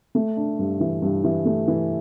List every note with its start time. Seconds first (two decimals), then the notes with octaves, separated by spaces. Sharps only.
0.15 A3
0.37 D4
0.59 G2
0.80 E3
1.02 G2
1.24 E3
1.45 A3
1.68 E3